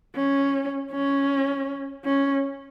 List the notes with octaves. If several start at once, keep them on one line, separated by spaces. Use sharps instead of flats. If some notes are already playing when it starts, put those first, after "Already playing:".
C#4
C#4
C#4